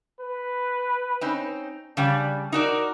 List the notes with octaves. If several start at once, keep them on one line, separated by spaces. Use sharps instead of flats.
B4
C4 C#4 D#4
C#3 G3 D4
D#4 F#4 A#4 D5